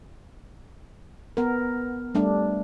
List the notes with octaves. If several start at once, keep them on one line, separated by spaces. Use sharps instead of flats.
B3 A#4
G3 A3 D4